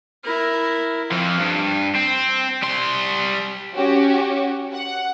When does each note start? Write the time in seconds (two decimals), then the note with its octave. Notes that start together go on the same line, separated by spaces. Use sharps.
0.25 E4 A#4
1.11 F2 F3
1.39 G2
1.96 C4
2.63 G3 C6
3.75 C#4 F#4 G4
4.74 F#5